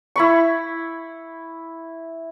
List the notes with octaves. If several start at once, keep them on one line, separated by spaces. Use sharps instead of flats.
E4 B5 C#6